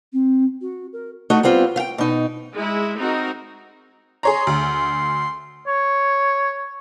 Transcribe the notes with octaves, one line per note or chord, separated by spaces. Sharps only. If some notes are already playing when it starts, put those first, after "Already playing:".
C4
F#4
A#4
A3 D#4 F#4
G3 B3 C4 F4
F5 G5
B2 D#4
G#3 E4
C4 D#4 F#4 A#4
G#4 C#5 A#5 C6
D2
C#5